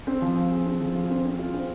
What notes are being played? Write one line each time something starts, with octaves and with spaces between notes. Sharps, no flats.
C4
F3
F3
G#4
C4
F3
F4
C4
C4
F4
C4